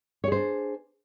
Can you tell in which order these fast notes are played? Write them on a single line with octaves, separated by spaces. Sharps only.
C#5 G#4 C5 D4